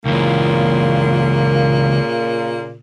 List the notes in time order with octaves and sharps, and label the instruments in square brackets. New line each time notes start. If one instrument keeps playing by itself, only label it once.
[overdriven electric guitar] C#2 E3 [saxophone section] A#2 C#3 A#3